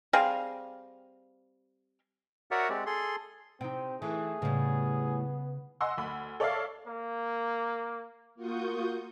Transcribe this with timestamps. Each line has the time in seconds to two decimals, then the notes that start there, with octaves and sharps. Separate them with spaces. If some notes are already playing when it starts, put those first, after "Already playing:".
0.13 G3 C4 G#4 F5
2.51 F#4 A#4 C#5 D5 E5 F#5
2.70 G#3 C4 G4 D5
2.86 G#4 A4 C6
3.61 C3 C4 D#4 G5
4.02 E3 A3 G#4
4.42 A2 C#3 G3 B3
5.81 D#5 F#5 G#5 C6 E6
5.98 D2 B5
6.40 A4 C#5 D5 E5 F5
6.87 A#3
8.35 A#3 F4 F#4 C#6 D#6 G6